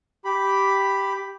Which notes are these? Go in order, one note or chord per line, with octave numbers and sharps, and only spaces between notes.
G4 B5